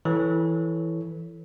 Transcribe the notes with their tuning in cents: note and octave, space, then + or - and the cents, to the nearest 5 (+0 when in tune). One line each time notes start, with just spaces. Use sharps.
E3 +0 A4 +0 C#5 +0